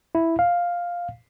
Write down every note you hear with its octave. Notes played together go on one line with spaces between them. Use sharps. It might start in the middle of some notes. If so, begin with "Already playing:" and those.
E4
F5